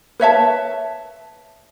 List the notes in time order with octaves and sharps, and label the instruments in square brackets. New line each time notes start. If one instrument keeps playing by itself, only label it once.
[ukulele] B4 C#5 E5 A5